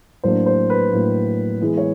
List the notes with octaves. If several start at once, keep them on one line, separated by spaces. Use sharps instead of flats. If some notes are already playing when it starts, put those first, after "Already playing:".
A2 F#3 A#3 D4 C5
C5
B4
A2 F#3 A#3 D4
E3 G#3 B3
C#5